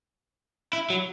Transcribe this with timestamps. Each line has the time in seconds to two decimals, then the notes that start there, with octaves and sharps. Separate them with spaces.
0.73 E4
0.90 F#3